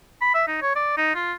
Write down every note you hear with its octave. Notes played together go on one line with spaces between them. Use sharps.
B5
E5
D#4
C#5
D5
D#4
F4